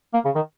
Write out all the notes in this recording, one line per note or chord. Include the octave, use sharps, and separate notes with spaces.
A#3
C#3
D#3